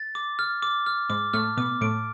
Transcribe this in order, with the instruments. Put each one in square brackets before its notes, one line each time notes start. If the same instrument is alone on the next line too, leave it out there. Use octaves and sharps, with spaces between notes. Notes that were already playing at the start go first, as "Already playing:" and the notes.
Already playing: [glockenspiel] A6
D6
F6
D6
F6
[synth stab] G#2 G#3 [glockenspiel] D6
[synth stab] A2 A3 [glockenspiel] F6
[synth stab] B2 B3 [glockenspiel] D6
[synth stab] A2 A3 [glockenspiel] D7